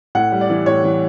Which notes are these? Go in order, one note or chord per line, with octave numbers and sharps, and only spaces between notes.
A2 F#5
G3
D5
E3
A2 C#5
E3